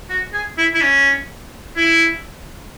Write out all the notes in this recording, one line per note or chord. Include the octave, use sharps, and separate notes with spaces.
F#4
G#4
E4
E4
C#4
E4